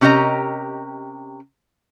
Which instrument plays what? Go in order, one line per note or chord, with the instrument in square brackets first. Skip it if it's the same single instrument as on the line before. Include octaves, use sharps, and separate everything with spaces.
[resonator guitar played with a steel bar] C3 C#4 G4 A#4 D#5 A#5